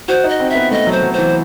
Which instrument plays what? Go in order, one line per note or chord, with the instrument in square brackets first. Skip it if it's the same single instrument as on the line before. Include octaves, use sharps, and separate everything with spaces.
[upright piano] F#4 [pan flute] C5
[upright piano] D#4
[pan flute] D#5
[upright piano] C4
[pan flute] E5
[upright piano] B3
[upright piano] A3 [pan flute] D#5
[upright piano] F#3 [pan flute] C5
[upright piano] F#3
[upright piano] E3 [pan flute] C5